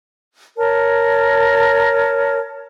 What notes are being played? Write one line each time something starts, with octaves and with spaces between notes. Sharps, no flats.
A#4 C#5 A5